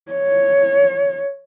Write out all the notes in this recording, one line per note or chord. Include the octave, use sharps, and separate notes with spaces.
C#5